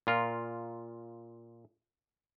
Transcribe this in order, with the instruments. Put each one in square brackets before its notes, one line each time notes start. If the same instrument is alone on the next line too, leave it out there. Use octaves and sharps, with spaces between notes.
[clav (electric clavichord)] A#2 F4 A#4